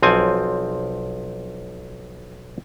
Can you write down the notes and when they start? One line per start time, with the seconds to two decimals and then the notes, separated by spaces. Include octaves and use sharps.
0.02 B1 F3 C4 G#5